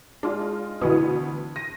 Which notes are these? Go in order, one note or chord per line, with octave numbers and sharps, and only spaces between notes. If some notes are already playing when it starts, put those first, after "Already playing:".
G#3 D4 D#4 F4
D2 B2 E3 B3 D#6
A#6 D#7